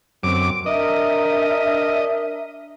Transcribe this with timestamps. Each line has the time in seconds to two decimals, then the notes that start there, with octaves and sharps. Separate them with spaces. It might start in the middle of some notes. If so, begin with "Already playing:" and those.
0.23 F#2 D3 F#3 C4 D6
0.66 D4 A#4 D#5 E5